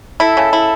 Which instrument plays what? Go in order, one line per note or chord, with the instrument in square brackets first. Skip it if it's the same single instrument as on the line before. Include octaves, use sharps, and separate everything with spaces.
[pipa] E4 [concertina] A4
[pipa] C#3
E4